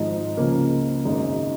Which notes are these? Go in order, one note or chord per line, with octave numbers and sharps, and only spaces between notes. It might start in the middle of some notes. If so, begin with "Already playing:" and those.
Already playing: G#1 G#2 F3 G#3 D#4
C#2 C#3 F3 A#3 C#4
G#1 F#2 C#3 G#3 D#4